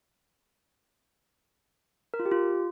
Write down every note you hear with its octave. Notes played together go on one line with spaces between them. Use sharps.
A#4
F4
G4
F4